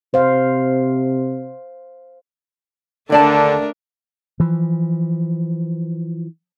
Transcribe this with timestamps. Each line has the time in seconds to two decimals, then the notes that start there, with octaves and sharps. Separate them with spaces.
0.14 C3 C5 F5
3.10 D#2 D3 A3 D4 A#4 D5 A5
4.40 E3 F3